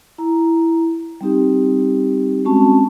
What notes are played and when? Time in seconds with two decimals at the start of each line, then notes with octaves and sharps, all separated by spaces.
0.18 E4 A#5
1.21 G3 C4 D#4 G4
2.45 G#3 C4 C#4 F#4 A5 C#6